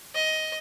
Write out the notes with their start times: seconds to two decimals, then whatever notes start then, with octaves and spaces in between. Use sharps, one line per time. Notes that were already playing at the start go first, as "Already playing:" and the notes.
0.15 D#5